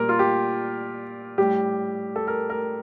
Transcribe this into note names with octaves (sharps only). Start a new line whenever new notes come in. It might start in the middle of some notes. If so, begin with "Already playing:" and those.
Already playing: A#2 G3 A#4
F4
G4
A2 G3 G4
A4
A#4
A#4